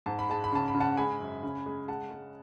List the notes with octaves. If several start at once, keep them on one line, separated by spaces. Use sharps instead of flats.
G#2 A5
B5
G#3 A5
B5
C#3 A5
B5
C#3
F#5 A5
G#3 G#5 B5
F#2
C#3
G#3
G#3 F#5 A5
G#3